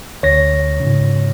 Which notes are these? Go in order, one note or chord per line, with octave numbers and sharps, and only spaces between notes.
D2 C#5 A#6
G#2 C#3